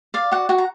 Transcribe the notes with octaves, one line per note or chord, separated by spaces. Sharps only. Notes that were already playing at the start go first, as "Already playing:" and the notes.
D5 F5
F#4 F#5
F#4 F#5
A#5